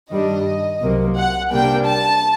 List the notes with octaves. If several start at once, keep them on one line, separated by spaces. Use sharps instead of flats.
G2 D#3 G3 D4 D#5
C2 C3 F#3 A#3
F#5
C3 G3 A#3 D4 G5
A5